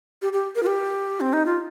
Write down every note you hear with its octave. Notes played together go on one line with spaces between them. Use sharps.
G4
G4
A#4
F4
G4
C4
D#4
F4